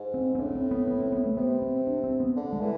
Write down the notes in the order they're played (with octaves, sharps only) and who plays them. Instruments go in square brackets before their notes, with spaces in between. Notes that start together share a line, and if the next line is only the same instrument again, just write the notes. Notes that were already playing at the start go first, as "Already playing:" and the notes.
Already playing: [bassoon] G#2
[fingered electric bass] C4
C4
[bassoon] A2 [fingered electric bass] D4
[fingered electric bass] D4
C4
B3
B3
C4
B3
A3
[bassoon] C3 [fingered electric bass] B3
[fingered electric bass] C4
D4
C4
B3
[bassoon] D3
[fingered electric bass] G#3
[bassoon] E3